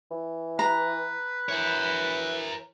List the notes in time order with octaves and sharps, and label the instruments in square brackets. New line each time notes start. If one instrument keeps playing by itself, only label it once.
[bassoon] E3
[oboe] B4 [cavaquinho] A#5
[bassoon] E3 [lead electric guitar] A#4 C#5